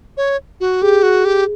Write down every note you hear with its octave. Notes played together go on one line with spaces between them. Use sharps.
C#5
F#4
G4 G#4
F#4
G4